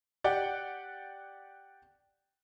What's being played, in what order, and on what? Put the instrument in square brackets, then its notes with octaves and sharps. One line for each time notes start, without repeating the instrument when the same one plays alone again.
[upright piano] G4 D5 F#5 G5